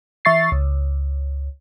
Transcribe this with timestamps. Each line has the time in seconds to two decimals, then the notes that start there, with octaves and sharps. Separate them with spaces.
0.25 E3 E5 C#6 A6 C7
0.52 C#2